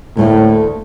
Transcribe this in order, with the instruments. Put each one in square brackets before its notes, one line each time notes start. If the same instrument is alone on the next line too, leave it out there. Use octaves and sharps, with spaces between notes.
[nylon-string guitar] D2 A3 A#3 [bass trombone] A2